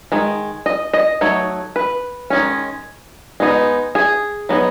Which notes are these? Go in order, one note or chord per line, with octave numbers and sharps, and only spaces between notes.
D#3 G#3
D#5
D#5
F#3 A3 D#4 C#5
B4
D#3 G#3 C#4
G#3 B3 D#4
G#4
F#3 B3 D#4